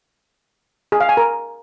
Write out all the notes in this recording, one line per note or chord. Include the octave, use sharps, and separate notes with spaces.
G#4
F5
G#5
A#4